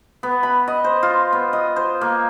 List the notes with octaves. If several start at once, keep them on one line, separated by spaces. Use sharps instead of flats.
B3
B5
D#5
C5
F4
B3
D#5
C5
A#3